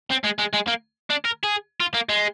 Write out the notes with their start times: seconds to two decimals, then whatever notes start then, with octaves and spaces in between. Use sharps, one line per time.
0.11 C4
0.25 G#3
0.39 G#3
0.54 G#3
0.68 A#3
1.10 D4
1.25 A#4
1.43 G#4
1.80 F4
1.94 A#3
2.09 G#3